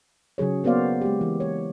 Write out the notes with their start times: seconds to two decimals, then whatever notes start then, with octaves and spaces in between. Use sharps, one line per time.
0.38 C#3 F#3 G#4 C#5
0.64 A#3 B3 F#4 C5 D5 F5
1.01 G#3 G4
1.21 E3
1.40 C#5